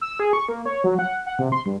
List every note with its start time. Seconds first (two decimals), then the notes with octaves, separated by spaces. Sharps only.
0.01 E6
0.20 G#4
0.33 C#6
0.49 A#3
0.65 C#5
0.84 F#3
0.99 F#5
1.26 F#5
1.39 C3
1.52 C6
1.66 G2